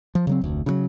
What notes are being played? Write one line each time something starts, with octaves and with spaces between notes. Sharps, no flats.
F3
C#3 F#3 C4
F1 D2
C#3 E3 F#3